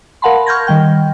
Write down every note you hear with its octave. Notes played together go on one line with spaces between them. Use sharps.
A#4 F5 F#5 A5 B5 C6
C#6 F6 G6 G#6 A#6
D#3 G3 G5 F6